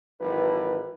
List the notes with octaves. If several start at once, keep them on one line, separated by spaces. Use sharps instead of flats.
G#1 E3 F#3 B4